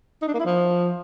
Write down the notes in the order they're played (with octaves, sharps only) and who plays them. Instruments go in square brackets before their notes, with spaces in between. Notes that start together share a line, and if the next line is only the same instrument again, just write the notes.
[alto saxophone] D#4
D4
A#3
E4
F3